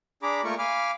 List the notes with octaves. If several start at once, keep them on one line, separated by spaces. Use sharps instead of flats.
D4 G#4 A#5 B5 D6
A3 A#3 F4 A#4 C#6
F5 G#5 B5 D6 F6